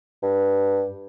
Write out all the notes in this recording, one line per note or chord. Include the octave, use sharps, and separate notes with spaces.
G2